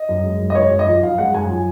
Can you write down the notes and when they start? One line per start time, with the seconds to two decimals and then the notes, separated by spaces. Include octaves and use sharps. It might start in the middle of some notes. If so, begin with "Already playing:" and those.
Already playing: D#5
0.09 F#2
0.24 G#3
0.40 F#2
0.50 D#5
0.55 G#3 C#5
0.71 F#2
0.79 D#5
0.87 F3
1.03 F#2 F5
1.18 G#3 F#5
1.34 F#2 G#5
1.50 F3